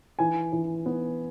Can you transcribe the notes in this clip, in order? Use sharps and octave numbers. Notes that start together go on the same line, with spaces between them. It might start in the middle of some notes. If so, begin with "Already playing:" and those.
E3 G#5
E3
B3